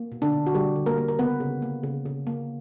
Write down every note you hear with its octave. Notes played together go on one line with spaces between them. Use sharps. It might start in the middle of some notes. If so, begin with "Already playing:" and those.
Already playing: A#3
B2
D3 D4
B2
F#4
D3 G3 G4
D3
A#3 A#4
A#3
A#4
C#3 B3 B4
C#3
A#3
C#3
C#3
A#3